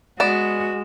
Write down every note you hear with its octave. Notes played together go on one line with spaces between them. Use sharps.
G#3 B3 F#4 D5 E7